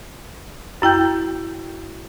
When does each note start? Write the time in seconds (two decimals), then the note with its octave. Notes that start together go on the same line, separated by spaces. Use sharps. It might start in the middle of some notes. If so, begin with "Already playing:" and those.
0.82 F#2 E4 G5 G6